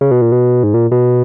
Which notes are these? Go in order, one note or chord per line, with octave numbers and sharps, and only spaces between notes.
C#3
B2
A#2
B2
G#2
A#2
B2